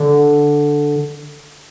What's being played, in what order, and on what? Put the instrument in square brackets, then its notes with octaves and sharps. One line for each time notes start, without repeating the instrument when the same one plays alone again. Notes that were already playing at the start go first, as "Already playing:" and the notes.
Already playing: [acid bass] D3